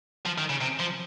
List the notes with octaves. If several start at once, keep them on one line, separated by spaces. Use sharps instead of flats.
F3
D#3
C#3
C3
F3